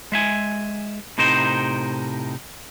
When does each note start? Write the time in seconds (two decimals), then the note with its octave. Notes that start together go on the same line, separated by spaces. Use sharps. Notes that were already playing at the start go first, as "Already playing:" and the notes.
0.12 G#3 E5 G#5
1.18 A2 C3 D#4 A#4 C5